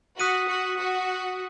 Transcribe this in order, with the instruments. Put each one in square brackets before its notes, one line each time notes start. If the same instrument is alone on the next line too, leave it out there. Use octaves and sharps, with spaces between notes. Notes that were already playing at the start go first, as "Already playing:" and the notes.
[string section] F#4 [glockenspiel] D#6 F#6 B6 D#7
[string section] F#4
F#4